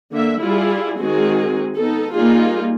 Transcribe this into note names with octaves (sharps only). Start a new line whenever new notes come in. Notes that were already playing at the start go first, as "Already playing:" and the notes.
D3 A#3 E5
G3 E4 F4 G#4
D#3 G#3 C4 F#4 G#4
B3 D#4 A4
G3 A#3 D#4 F4 G#4